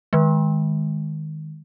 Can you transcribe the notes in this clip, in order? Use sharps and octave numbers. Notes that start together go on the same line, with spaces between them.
D#3 G#3